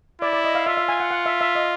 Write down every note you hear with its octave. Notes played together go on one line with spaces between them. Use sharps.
E4 D5
D5
D#5
F5
F4 E5
E5
G#5
F#5
F#5
E5
E5
D#5